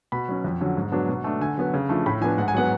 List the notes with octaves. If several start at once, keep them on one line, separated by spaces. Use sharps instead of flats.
B2 B5
F#3 C#4
F2
D3 F#3 C#4
G#2
F#3 B3 D4
B2
A3 D4
D3 G#5
F#3 B3
C#3
F3 A3 D4
A2 B5
F3 B3 D4 G#5
G#2 F#5
G#5
F#3 B3 F#5